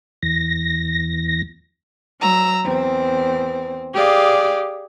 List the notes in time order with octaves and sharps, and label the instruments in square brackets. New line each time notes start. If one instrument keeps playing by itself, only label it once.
[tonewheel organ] E2 A#6
[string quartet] F#3 A#5 E6
E2 C4
G4 G#4 D5 F5